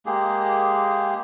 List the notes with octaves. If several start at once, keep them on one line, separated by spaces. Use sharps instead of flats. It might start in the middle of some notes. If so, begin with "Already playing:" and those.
G#3 A#3 G4 G#4